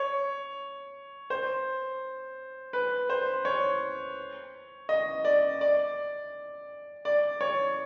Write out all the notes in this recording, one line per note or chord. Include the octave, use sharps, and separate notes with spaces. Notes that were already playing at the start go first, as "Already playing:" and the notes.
Already playing: C#5
C5
B4
C5
C#5
D#5
D5
D5
D5
C#5